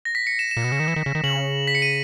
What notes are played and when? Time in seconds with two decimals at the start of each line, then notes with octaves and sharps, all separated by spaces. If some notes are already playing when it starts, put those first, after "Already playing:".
0.05 A#6
0.15 B6
0.27 C#7
0.39 E7
0.51 E7
0.57 A#2
0.64 B2
0.72 C#3
0.80 D#3
0.88 E3
0.96 D#3
1.06 C#3
1.15 D#3
1.24 C#3 F#7
1.68 B6
1.75 C#7
1.82 D#7